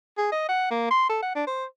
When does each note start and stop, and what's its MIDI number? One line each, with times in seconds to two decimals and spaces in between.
0.18 0.28 68
0.32 0.44 75
0.49 0.68 78
0.71 0.90 58
0.91 1.09 84
1.09 1.20 69
1.22 1.30 78
1.35 1.44 62
1.47 1.65 72